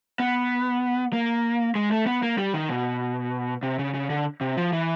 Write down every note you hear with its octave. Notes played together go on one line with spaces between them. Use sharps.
B3
A#3
G#3
A3
B3
A#3
G3
D#3
B2
C3
C#3
C#3
D3
C3
F3
E3